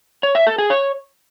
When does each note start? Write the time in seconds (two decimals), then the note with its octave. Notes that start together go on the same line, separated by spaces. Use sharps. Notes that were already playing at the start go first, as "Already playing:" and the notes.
0.23 C#5
0.35 E5
0.47 A4
0.58 G#4
0.70 C#5